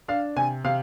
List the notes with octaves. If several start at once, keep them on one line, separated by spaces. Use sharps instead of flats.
D4 F5
C3 G#5
C3 F5